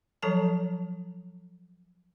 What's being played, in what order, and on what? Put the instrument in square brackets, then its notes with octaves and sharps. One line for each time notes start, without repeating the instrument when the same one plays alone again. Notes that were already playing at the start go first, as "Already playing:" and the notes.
[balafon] F3 F#3 A4 C#5 A5 A#5